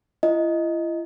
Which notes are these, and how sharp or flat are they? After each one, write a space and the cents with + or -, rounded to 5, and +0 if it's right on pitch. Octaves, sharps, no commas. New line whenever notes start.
E4 +45 D#5 +5